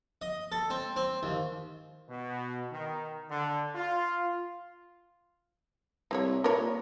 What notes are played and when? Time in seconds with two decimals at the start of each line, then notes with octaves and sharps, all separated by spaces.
0.22 D#5
0.52 A4
0.70 C4
0.96 C4
1.23 D#2
2.09 B2
2.72 D#3
3.30 D3
3.76 F4
6.11 C2 C4 E4 C#5
6.44 A#2 A#4 B4 C#5